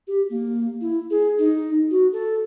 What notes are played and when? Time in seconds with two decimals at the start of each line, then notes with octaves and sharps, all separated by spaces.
0.07 G4
0.30 A#3
0.81 E4
1.10 G#4
1.38 D#4
1.91 F#4
2.13 A4